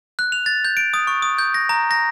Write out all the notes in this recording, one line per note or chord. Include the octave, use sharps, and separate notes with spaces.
F#6
F7
A6
G6
D7
D#6
C#6
D#6
G6
A#6
A#5
A#6